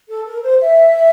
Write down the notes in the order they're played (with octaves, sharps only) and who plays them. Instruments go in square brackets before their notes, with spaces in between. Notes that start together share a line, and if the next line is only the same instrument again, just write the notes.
[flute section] A4
A#4
C5
E5